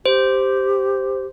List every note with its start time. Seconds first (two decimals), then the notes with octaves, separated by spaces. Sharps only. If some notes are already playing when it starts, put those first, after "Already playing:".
0.06 G4 C5